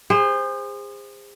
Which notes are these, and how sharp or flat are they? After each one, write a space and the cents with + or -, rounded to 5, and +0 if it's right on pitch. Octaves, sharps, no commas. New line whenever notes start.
G#4 -35 C5 +0